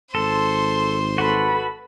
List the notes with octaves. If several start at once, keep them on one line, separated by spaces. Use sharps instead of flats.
G#1 A4 C5 C6
F#4 A4 B4 B5